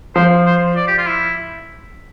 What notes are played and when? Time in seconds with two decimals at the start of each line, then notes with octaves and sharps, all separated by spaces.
0.15 F3 C5
0.46 C5
0.76 D5
0.88 G4
0.98 F4
1.07 E4